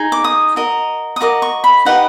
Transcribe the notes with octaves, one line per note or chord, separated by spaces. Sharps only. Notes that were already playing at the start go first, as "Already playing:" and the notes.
Already playing: D#4 G#4
D6
D#6
F#4 A#4 D#5
D#6
F#4 A#4 D#5 D6
C#6
B5
D#4 G4 B4 D#5 F#5